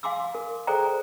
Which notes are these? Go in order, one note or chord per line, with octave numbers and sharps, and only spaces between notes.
F5 G#5 C6 D6 E6
A#4
G#4 A4 C5 D5 G5 A#5